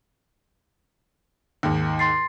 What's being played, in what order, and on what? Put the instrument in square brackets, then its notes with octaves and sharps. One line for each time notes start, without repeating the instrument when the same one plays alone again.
[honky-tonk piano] D#2 G#2
[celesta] C6 A6 C7